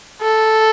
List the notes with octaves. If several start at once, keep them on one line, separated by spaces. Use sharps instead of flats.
A4